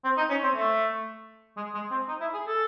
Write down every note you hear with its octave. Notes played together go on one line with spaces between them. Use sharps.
C4
D#4
C#4
C4
A3
G#3
G#3
C4
D#4
E4
G#4
A4